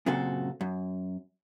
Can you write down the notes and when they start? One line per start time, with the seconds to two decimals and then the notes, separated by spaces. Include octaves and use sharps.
0.06 F#2 A#2 C#3 C4 F#4 A4
0.61 F#2